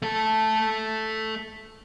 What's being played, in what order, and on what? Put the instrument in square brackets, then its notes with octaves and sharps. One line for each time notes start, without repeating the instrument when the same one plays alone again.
[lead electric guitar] A3 A4